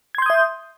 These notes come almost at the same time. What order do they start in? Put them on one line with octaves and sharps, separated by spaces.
G#6 C6 G6 D#6 E5